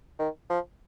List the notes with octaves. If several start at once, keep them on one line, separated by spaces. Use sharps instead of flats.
D#3
F3